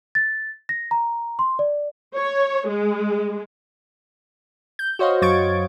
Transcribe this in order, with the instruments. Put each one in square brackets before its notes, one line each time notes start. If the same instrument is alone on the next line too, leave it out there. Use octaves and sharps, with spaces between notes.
[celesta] A6
A#6
A#5
C6
D5
[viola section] C#5
G#3
[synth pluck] G6
F#4 C5 C#5 D#5 F5
F#2 F#3 C#6 G#6 A6 D7